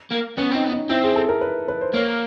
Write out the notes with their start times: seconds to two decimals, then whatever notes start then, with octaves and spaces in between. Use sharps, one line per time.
0.11 A#3
0.38 B3 C#4
0.51 C4 D#4
0.64 B3
0.72 D#4
0.89 C4 E4
1.03 G#4
1.16 A4
1.29 A#4
1.41 B4
1.68 B4
1.81 C5
1.94 A#3 C#5